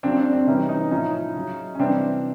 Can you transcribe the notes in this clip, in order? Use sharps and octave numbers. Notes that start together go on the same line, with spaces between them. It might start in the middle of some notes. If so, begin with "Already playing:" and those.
C#3 F#3 C4 D4
C4 D4
C4 D4
C3 E3 G3 C#4 D#4
C#4 D#4
A2 F3 C#4 D#4
C#3 F#3
C#4
C3 E3 G3 C4 D4